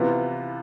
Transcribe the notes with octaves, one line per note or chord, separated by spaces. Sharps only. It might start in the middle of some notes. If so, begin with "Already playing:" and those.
Already playing: C3 E3 B3 F4